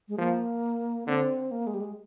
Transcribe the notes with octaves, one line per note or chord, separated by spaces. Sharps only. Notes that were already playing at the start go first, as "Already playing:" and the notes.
G#3
F3 A#3
D3 C4
A#3
G#3
G3
G#3